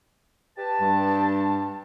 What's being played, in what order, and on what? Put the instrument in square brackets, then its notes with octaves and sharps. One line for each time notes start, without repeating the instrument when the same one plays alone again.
[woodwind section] G4 B4 A5
[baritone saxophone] G2